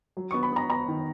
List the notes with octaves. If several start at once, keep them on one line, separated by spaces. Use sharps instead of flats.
F#3
B3 C#6
B5
B3 A#5
B3 A#5
D#3